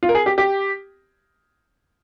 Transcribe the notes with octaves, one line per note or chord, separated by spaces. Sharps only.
F4
A#4
G#4
G4
G4